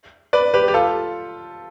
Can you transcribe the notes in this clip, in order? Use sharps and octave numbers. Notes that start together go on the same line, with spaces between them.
B4 D5
G4 B4
G4
F4 A4